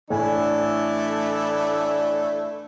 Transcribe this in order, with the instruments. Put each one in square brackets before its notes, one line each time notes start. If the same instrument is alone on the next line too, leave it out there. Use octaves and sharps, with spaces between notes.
[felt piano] A2 G#5 [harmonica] E3 A3 E4 [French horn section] D4 D5